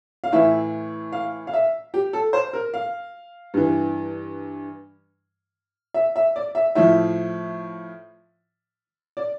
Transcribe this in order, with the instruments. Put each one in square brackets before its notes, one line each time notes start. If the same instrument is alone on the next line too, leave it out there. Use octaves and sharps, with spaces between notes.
[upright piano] F5
A2 E3 E5
F5
F5
E5
G4
A4
C5
A#4
F5
G2 E3
E5
E5
D5
E5
A2 F3 E5
D5